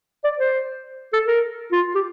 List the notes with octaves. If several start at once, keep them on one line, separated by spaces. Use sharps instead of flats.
D5
C5
A4
A#4
F4
G4